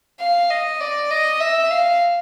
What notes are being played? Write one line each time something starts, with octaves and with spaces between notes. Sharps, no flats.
F5
D#5
D5
D#5
E5
F5